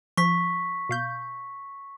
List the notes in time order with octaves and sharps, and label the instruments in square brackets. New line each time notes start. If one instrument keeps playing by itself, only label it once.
[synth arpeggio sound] F3 [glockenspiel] C#6 B6
[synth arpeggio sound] B2 F5 G6